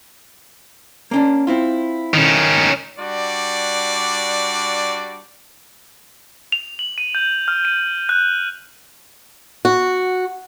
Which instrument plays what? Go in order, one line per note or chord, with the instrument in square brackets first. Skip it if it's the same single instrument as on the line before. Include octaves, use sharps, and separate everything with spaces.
[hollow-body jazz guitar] A#3 C#4 D4
C4 E4 F4
[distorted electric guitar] D#3 C#4
[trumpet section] G3 D4 F#4 D5
[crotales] F7
F#7
D#7
G6
F6
D#7
F#6
[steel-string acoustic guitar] F#4